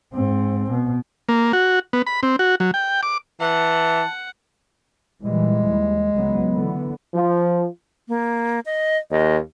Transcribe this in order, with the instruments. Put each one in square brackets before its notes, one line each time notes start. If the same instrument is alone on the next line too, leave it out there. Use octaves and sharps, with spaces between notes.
[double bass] G#2 C4
B2
[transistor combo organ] A#3
F#4
B3
B5
C4
F#4
F#3
G5
D6
[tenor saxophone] E3 [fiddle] F#5 [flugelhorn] A5
[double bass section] A#2 E3 G3 [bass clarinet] G#3
[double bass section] D#2
C#2 F#3 B3
D3 E3 B3
[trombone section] F3
[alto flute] A#3
D#5
[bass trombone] D#2 [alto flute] D#5